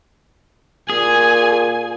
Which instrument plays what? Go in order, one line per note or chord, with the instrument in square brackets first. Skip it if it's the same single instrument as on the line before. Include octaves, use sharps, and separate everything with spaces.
[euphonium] A#2 [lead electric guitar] G#4 [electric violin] G#5